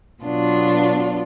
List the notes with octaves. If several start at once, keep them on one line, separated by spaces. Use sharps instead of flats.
B2 F#3 B3 D4 F4